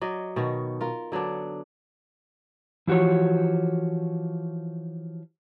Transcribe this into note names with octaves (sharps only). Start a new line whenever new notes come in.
F#3 D5 D#5
B2 D#3 F#4
F4 A#4
D3 F#3 B3 D4
E3 F3 F#4 G4 C#5